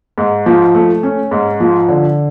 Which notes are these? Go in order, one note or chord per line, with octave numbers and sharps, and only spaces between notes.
G#2
F3
A3
C#4
G#2
F3
D3